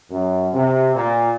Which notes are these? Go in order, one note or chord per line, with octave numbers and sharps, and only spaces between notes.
F#2
C3
A#2